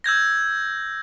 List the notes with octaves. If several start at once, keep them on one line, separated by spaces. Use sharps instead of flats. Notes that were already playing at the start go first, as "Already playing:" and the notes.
E6 G6 G#6 A#6